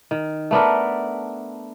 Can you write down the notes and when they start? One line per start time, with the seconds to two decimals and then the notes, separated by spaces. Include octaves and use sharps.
0.11 D#3
0.51 A3 B3 D4 A#4